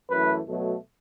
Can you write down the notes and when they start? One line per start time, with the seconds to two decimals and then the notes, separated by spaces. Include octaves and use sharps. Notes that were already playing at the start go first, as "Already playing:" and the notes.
0.10 F#2 E3 A3 B4
0.47 B2 F#3 A3